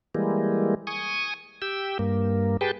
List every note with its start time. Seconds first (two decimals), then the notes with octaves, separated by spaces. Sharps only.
0.15 E3 G3 G#3 A#3
0.87 G#5 C#6 D#6
1.62 G4 G5 E6
1.99 G2 A#3
2.61 G4 G#4 B4 G5 A5